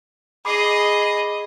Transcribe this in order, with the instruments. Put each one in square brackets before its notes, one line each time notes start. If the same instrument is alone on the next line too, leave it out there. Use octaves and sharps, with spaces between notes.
[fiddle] G#4 D#5 [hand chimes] B5 D6 C7